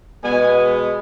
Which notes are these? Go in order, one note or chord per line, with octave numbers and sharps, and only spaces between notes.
B2 G#3 B3 G#5